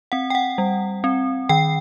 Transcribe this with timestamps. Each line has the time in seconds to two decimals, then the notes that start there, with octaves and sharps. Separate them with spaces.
0.12 C4 F#5
0.30 G5
0.35 F#5
0.58 G3
1.04 C4
1.49 D#3 G5